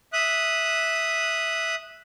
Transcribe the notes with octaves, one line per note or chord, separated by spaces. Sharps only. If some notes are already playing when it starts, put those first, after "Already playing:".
E5 D#6 F#6